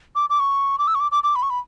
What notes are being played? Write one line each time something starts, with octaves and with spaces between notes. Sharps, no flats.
D6
D6
C#6
D6
E6
C#6
D6
D6
D6
B5
C#6
B5